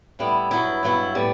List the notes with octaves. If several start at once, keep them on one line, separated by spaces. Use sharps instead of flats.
A2 G3 B3 E4
G2 F#3 B3 E4
G2 F#3 B3 E4
A2 G3 B3